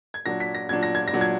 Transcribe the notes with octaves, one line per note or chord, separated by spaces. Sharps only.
G#6
A#2 F#3 D4 A#6
B6
A#6
A#2 F#3 D4 G#6
A#6
G#6
A#6
A#2 F#3 D4
G#6